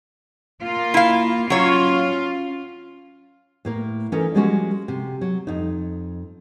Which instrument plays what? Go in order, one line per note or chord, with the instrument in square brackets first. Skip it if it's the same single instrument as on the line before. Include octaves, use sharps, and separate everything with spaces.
[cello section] A#3 F4
[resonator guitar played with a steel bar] E4 F5
[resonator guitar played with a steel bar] F#3 C#5 [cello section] C#4 F4
[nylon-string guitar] A2 A#3 A#4
E3 C#4 D#4 A4 A#4
F3 G3 G#3 A#3 C#4 F#4
C3
F#3
F2 D#4